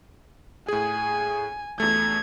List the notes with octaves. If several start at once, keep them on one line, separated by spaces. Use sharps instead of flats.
A2 G#4 G#5
E2 A3 G#6